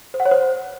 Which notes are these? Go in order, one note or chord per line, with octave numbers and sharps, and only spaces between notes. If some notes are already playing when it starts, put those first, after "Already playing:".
C5
F#5
C#5
C5